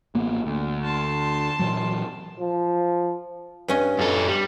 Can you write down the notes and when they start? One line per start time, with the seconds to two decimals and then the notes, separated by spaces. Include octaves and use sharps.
0.15 A1 A#3 B3
0.46 D2
0.85 A5 C6
1.59 A#2 E3 F#3
2.40 F3
3.68 G2 C#4 D#5
3.99 F#2 A4
4.28 G3